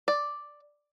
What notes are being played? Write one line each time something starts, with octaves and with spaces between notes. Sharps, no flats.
D5